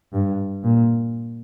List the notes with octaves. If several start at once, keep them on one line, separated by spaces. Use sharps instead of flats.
G2
A#2